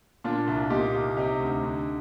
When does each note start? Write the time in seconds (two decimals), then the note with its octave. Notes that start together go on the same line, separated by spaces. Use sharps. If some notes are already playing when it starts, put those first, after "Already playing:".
0.24 A#2 D4 F4
0.47 C2
0.70 A#2 D#4 G4
0.94 C2
1.17 C3 D#4 G4
1.40 D2
1.63 D3